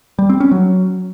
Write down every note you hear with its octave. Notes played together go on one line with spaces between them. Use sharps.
G3
C4
C#4
F#3